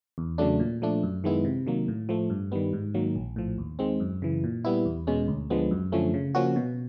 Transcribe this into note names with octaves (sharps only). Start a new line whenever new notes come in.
E2
C#3 F#3 A3 D4
A#2
F3 A3 D4
F#2
D#3 G#3 B3 E4
C3
D#3 F#3 A#3
A2
F3 A3
G2
D#3 G3 B3
G#2
D#3 F#3 A#3
A#1
A2 F3
D#2
D#3 G#3 C4
F#2
C#3 E3
A#2
G3 B3 E4
E2
B2 G#3 C#4
D2
D3 F3 G#3 B3
F#2
D3 F3 A3 C#4
C#3
F3 A#3 C#4 F#4
B2